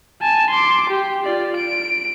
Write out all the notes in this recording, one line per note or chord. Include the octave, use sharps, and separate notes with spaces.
G#5 A5
C6 D6
G4
F4 D5
D7